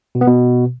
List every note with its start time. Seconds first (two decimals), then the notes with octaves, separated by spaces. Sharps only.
0.15 B2
0.21 B3
0.27 B2